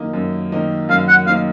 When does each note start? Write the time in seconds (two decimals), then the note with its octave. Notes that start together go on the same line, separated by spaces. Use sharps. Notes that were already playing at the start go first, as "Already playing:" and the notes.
Already playing: F#2 D#3 A#3 D#4
0.14 F#2
0.52 D#3 A#3 D#4
0.89 F#2 F5
1.08 F#5
1.26 D#3 A#3 D#4 F5